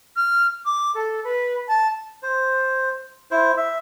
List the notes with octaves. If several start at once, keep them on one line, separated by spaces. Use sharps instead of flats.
F6
D6
A4
B4
A5
C5
E4 C5
E5